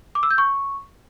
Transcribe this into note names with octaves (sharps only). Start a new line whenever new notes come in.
D6
E6
G6
C#6